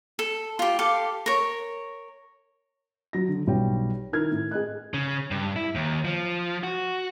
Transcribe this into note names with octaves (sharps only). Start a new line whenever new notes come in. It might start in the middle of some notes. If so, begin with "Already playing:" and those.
A4
F4 G4
G4 A4 F5 D6
A#4 C#5
F#3 A#6
D3
B1 G3 C#5 G5
D#3 E4 A#4 F6 G#6
A2
G#4 D#5 F#6
C#3
G2
E4
D#2
F3
F#4